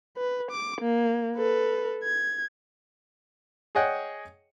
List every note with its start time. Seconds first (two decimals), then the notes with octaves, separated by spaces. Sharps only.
0.17 B4
0.51 D6
0.81 A#3
1.37 A4 B4
2.03 G#6
3.75 G#4 C#5 D#5 F#5 G5